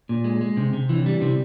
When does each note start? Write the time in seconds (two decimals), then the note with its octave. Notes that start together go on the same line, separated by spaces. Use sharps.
0.09 A#2
0.24 G#3
0.41 G#3
0.57 C3
0.73 C3
0.89 E3
1.06 G3
1.22 C3